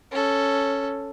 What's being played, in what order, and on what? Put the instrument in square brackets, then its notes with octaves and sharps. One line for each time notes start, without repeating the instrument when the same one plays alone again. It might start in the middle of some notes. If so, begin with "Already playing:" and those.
[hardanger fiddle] C#4 A4